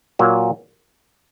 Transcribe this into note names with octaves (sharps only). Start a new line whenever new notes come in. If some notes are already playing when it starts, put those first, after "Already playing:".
A#2 F#3 A#3